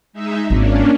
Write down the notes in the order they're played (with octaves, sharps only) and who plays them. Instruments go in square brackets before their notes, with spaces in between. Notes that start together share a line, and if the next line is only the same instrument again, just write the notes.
[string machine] G#3 D#4 E5
[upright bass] G#1 [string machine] A#3 C#4 D4